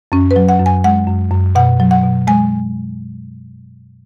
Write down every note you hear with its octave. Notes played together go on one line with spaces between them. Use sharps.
F#2 C#4
B4
F#3
F#5
F#2
G#5
G#3 F#5
F#2
F#2
B2 F#5
F#3
F#5
B2
G#3 G#5